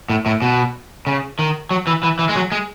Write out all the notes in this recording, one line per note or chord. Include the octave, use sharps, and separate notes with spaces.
A2
A2
B2
C#3
D#3
F#3
E3
E3
E3
G#3
F#3
G#3